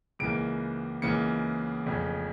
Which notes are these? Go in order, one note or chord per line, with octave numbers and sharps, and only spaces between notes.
C#2 C#3 E3 A#3 D7
C#2 C#3 E3 A#3 C#7
F1 F2 C#3